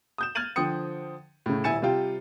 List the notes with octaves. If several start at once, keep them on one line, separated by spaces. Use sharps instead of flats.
D#6 G6 E7
F6 G#6 A6 D#7 F#7
D3 F3 C5 G5 D#6 C#7
A2 C#3
D#1 E4 G#5 A6 C#7 E7
C3 G3 F4 G5